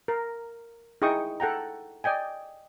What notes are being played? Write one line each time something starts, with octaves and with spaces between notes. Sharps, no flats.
A#4
D#4 E4 G#4 G5 C#6 D#6
A4 F#5 G5 A#5
D5 D#5 G5 G#5